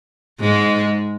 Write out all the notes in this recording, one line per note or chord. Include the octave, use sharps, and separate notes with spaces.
G#2 G#3